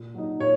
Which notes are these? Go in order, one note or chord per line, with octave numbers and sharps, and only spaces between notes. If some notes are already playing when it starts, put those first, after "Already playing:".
Already playing: A#2
F#3 D#4
A#2 C#5